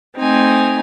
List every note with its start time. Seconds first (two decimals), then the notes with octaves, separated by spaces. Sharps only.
0.17 A3 C4 D#4 G#5